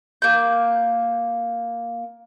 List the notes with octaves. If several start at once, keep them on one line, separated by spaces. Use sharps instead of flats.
A#3 G6